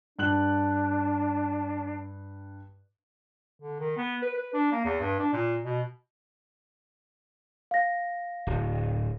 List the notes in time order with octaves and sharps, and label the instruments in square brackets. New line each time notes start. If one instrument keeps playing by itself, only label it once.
[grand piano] G2 F#6 F#7 [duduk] D4
[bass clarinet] D3
D#3
B3
B4
B4
D4
A#3
E2
G2
D4
A#2
B2
[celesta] F5 A#6
[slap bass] D1